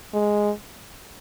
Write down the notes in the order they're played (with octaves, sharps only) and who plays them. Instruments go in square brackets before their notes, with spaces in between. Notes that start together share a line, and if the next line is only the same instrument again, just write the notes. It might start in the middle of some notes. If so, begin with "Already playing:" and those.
[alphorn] G#3